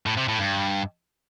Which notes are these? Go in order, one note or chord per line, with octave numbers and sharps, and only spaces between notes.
A2
C3
A2
G2